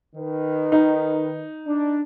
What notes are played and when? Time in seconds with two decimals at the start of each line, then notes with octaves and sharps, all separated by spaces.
0.16 D#3 B4
0.72 D#4
1.67 D4